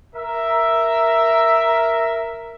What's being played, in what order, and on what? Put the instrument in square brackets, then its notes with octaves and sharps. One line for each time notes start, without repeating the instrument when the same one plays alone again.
[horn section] A#4 E5